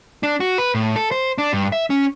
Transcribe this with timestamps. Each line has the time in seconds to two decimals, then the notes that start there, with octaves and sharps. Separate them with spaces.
0.23 D4
0.40 F#4
0.58 B4
0.74 A2
0.96 A4
1.11 C5
1.38 D4
1.53 G2
1.72 E5
1.90 C#4